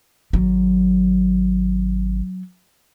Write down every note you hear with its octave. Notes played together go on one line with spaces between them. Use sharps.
G#1 F#3